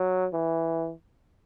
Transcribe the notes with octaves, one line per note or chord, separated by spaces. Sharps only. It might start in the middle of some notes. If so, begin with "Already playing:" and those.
Already playing: F#3
E3